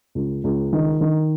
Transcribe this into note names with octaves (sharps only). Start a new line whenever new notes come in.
C#2
C#2
D#3
D#3